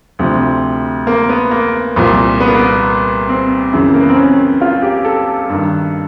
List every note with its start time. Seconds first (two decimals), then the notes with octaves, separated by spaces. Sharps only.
0.19 D2 C3 F3
1.07 A#3
1.29 B3
1.51 A#3
1.96 C2 A#2 F3
2.40 B3
2.48 A#3
2.55 B3
3.28 C4
3.73 F#2 C#3 E3
3.94 A#3
4.02 B3
4.09 C4
4.16 C#4
4.61 F4
4.82 G4
5.05 A4
5.49 G2 D#3